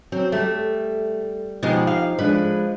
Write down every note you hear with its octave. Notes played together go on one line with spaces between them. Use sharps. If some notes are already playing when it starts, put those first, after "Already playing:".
F#3 C4
G3 A3
B2 F3 G#3 D#4 G4
F5
F3 G#3 D4 B4